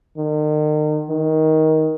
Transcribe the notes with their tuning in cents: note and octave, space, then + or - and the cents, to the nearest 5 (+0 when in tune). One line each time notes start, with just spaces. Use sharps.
D#3 -40
D#3 +15